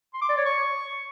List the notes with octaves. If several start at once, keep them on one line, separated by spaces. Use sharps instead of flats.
C6
D6
D5
C#5
C#6